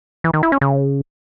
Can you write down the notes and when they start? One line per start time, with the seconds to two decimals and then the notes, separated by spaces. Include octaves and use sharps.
0.24 E3
0.34 D#3
0.43 E4
0.52 C#4
0.61 C#3